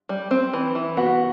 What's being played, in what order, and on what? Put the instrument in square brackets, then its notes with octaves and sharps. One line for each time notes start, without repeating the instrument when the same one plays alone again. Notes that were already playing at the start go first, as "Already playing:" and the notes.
[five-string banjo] G3
C4
E3
E3
[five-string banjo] B3 [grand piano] F#4 F#5